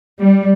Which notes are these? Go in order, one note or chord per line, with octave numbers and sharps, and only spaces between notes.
G3